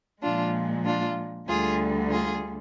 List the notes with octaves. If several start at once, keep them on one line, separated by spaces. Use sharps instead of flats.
A#2 F3 G#3 D4 F4
D4 F4
D2 D3 G3 F4 G#4
F4 G#4